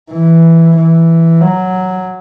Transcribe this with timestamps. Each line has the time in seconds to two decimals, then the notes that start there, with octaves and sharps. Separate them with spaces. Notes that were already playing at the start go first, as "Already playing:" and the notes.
0.12 E3
0.77 E3
1.41 F#3